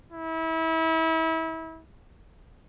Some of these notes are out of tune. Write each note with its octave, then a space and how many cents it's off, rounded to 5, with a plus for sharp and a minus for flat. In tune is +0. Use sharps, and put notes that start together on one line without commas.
E4 -30